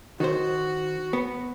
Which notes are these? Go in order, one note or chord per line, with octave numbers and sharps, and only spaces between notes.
D#3 F#4 C5
B3